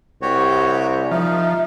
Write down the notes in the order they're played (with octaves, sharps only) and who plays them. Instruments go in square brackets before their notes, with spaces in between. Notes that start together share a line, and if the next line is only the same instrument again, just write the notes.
[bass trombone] C2 [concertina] F#4 G4 C#5
[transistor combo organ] F3 [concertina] D#4 [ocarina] E5